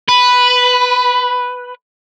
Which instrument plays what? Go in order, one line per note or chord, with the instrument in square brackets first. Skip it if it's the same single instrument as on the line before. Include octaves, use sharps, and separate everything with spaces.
[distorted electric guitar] B4